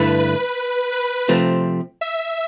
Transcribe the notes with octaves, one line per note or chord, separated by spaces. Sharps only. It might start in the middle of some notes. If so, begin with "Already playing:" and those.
Already playing: G2 D3 A3 E4 A4 B4
B4
B4
C3 F3 A3 C4
E5